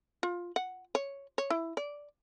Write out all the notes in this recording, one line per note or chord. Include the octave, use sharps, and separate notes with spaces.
F4
F#5
C#5
C#5
E4
D5